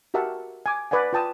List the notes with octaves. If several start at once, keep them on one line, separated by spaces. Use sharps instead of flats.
F#4 G4 A#4 E5 F#5 A5
G#5 D6
B4 D5 F#5 G#5
F4 B4 G5 A5 D#6